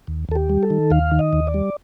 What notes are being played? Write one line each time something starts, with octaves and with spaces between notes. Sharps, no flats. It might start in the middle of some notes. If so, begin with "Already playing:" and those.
D#2
D#2 A4
G4
G3
A4
D#3
D#2 F5
D#3
D#5
D#2
D5
G3